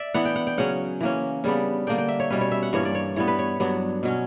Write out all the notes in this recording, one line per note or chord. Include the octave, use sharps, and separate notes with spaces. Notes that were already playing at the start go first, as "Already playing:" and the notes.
Already playing: D5 E5
E3 B3 D4 F#5
G5
F#5
G5
C#3 F#3 C#4 F#5
E3 A#3 C#4
C#3 G3 B3 D4
D3 A#3 D4 G5
G5
E5
C#5
B2 G3 C#4 B4
C#5
E5
F#5
G2 E3 A#3 C#4 C#5
D5
C#5
E3 G3 B3 C#5
B4
C#5
G2 F#3 B3 D4
B2 F#3 C#4